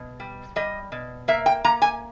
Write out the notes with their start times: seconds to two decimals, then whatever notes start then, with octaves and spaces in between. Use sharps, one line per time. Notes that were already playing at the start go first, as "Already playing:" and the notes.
Already playing: B2
0.20 G3
0.56 G3 D#5
0.92 B2
1.28 A#3 E5
1.46 G5
1.64 A#3 A#5
1.82 G#5